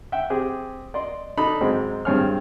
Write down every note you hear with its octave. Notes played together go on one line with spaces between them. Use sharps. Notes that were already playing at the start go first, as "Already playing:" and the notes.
E5 F#5 G5
C4 G4 G#4
D5 D#5 C6
D4 D#4 A4 B5
G#2 F#3 G#3 C4
G#1 G2 C4 C#5 G#5 F6